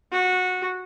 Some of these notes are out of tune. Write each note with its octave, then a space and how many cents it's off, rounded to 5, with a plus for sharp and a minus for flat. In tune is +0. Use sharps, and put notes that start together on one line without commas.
F#4 -15